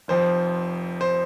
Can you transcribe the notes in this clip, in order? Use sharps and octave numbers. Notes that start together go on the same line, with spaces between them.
F1 F2 F3 C5
C5